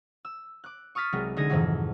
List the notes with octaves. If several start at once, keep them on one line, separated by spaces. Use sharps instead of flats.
E6
D6 F#6
C#6 D#6 F6 A6 B6
C2 F#3 G#3
D3 G#3 D#4 G#6 A#6 D#7
F2 G#2 C3 D#3 E3 F#3